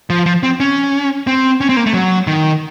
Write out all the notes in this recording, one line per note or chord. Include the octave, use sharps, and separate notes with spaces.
F3
F3
C4
C#4
C4
C#4
C4
A#3
A3
F#3
D#3